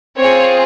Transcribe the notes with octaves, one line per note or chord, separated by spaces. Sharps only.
C4 F4 G#4 C#5